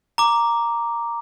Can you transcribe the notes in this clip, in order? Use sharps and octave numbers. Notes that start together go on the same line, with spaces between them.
A#5 D6